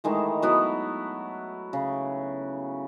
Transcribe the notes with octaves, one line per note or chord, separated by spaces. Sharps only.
D#3 E3 G#3 A3
F#3 B3 E4
C#3